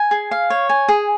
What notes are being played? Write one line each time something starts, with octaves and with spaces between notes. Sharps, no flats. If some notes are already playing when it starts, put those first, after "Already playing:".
Already playing: G#5
G#4
F5
C#5
G#5
G#4